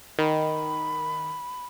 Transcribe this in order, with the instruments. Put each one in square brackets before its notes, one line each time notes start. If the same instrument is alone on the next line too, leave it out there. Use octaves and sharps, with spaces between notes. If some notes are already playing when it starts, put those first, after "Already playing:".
[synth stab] D#3 [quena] B5